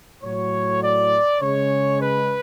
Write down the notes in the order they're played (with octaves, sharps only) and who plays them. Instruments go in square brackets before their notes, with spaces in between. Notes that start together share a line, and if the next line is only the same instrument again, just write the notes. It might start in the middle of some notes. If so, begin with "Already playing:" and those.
[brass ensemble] A2 F#3 C#5
D5
C#3 G#3 C#5
B4